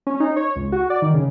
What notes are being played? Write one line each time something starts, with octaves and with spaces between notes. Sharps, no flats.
C#4
D#4
C#5
C#2
F#4
D5
D#3
C#3